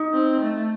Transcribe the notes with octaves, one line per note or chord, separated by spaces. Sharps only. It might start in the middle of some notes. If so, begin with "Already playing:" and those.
Already playing: D#4
C4
A3